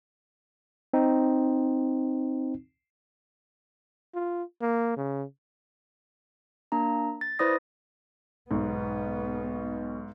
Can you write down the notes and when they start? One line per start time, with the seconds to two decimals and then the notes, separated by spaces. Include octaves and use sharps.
0.93 C4 D#4
4.15 F4
4.62 A#3
4.97 C#3
6.72 A#3 D4 A#5
7.21 A6
7.39 E4 B4 C5 D5 D#6 A#6
8.51 B1 G#2 B3